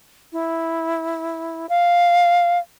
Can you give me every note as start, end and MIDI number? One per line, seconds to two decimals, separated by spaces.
0.33 1.66 64
1.69 2.58 77